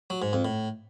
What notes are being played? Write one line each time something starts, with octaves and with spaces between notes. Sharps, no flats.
F#3
G#2
F2
A2